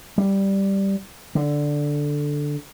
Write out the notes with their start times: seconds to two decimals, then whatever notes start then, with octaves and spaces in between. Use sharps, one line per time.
0.18 G3
1.35 D3